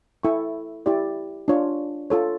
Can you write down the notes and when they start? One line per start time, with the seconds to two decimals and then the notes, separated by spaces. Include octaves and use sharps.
0.23 E4 A4 E5 G5 C#6
0.86 E4 G4 D5
1.48 D4 F4 C#5
2.10 F4 A4 C#5